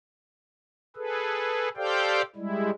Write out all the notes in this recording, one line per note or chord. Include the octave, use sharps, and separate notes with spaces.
G#4 A4 B4
G4 A4 C5 D5 F5 G5
G3 G#3 E4